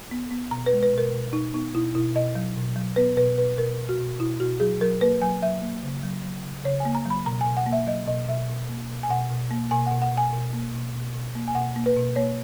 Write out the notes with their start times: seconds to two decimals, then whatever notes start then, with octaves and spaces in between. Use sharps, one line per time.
0.11 B3
0.31 B3
0.51 B2 A#5
0.66 B4
0.73 G#3
0.83 B4
0.93 B2 A#4
1.13 B2
1.33 B2 D#4
1.54 B3 D#4
1.75 B2 E4
1.95 B2 E4
2.15 B2 D#5
2.35 F#3
2.57 B2
2.76 F#3
2.96 B3 B4
3.17 B2 B4
3.38 B2 B4
3.58 B2 A#4
3.78 B2
3.89 F#4
4.00 B2
4.20 B2 E4
4.40 B2 F#4
4.60 F#3 G#4
4.81 F#3 A#4
5.01 A#3 B4
5.22 F#3 G#5
5.42 F#3 E5
5.62 A#3
5.83 C#3
6.03 F#3
6.24 F#3
6.44 C#3
6.65 C#3 C#5
6.80 G#5
6.85 A#3
6.95 A#5
7.05 F#3
7.10 B5
7.26 B2 A#5
7.41 B2 G#5
7.57 F#5
7.66 A#3
7.73 E5
7.87 F#3 D#5
8.07 B2 D#5
8.28 B2 E5
8.49 B2
8.69 A#3
8.89 B2
9.03 G#5
9.10 B2 F#5
9.30 B2
9.51 A#3
9.71 B2 G#5
9.87 B2 F#5
10.02 F#5
10.11 B2
10.17 G#5
10.33 B2
10.53 A#3
10.73 B2
10.94 B2
11.15 B2
11.35 A#3
11.48 G#5
11.55 B2 F#5
11.76 A#3
11.86 B4
11.96 B2
12.16 A#3 C#5